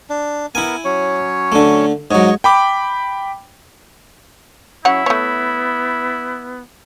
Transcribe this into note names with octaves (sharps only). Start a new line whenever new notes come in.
D4
B3 E4 A#4 G#5
F#3 C#4 C#5
D3 A3
G#2 F#3 C#5 D#5 C#6
G5 B5 D6
F#3 C#4 E4 C#5 F#5
A3 B3 C#5